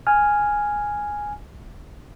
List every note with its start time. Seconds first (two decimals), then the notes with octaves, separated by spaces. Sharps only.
0.07 G#5 F6